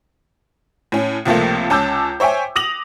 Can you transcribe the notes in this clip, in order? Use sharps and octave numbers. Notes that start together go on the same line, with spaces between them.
A2 C#4
C#2 C3 F3 A3 A#3
C#2 C#4 A5 D6 E6 G6
C5 C#5 E5 G5 G#5
D6 D#6 A#6 F7 F#7